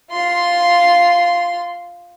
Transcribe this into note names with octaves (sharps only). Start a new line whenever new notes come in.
F4 C6